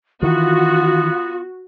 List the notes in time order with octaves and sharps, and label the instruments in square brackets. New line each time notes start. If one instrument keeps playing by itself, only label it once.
[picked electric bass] D#3 E3 [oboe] B3 [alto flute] F4 [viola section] F#4